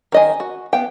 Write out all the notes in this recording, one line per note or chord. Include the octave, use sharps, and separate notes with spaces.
D#3 D#5 G#5
F#4
B3 F5 G5